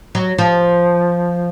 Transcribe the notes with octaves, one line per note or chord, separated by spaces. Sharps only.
F#3
F3